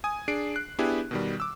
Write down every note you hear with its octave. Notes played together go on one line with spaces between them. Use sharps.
G#5 D#6
D4 G#4 C7 D7
F#6
B3 D4 E4 G4 G#4
B2 D#3 G3
D6 E6